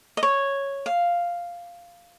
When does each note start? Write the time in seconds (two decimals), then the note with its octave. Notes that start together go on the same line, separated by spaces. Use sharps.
0.17 D#5
0.23 C#5
0.86 F5